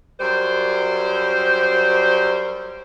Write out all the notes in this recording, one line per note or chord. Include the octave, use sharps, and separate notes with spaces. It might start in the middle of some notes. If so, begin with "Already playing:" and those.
F#2 G3 C5